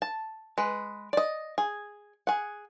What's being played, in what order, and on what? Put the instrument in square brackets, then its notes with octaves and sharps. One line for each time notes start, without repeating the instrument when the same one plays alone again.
[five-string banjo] A5
G#3 B4
D5 D#5
G#4
G#4 F#5